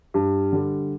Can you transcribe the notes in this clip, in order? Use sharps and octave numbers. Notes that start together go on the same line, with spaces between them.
G2
D3 G3